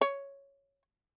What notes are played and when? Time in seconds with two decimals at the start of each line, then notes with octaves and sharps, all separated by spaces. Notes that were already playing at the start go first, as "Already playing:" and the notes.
0.01 C#5